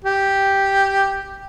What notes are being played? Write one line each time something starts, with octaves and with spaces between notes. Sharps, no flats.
G4